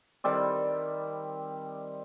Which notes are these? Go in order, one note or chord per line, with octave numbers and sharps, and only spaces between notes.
D#3 G3 C4 D5